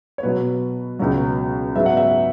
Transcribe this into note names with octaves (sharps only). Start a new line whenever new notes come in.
C#5
B2 F#3 B3 B4
C#2 B2 F#3
G#2 F#3 B3 E5
F#5
E5